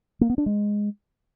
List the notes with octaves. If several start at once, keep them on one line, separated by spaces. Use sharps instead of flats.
A#3
B3
D4
G#3